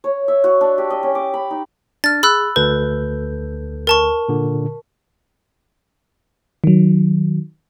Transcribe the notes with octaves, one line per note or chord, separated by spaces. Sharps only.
C#5
E5
F#4
D4
G4
D#5
C#4
D6
B5
D#4
D4 F6 A6
G#4 B5 E6 F#6
D2 A4 B4 G6
A#4 A5 C#6
A#2 D3
D#3 F#3